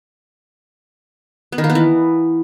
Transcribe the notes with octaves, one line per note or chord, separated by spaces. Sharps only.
B3
D#3
A#3
B3
E3